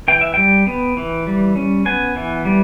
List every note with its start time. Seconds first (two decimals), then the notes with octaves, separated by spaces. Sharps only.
0.08 E3 G5
0.21 E5
0.34 G3 G5
0.67 B3
0.97 E3
1.27 G3
1.56 C#4
1.86 B3 G#5
2.16 E3
2.45 G3